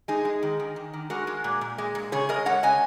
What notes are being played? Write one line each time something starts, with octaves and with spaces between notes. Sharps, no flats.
G#3 D#4 G#4
G#3
D#3
D#3
D#3
D#3
G#3 F#4 A#4
G#3
A#2
A#2
G#3
A#2
C#3 G#4 C#5
G#3 A#4 D#5
G#3 C#5 F#5
C#3 D#5 G#5